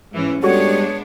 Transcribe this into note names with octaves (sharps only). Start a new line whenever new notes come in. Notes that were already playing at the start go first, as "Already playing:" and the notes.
G#2 E3 C#4
G3 G#3 B3 D4 F#4 A4 C#5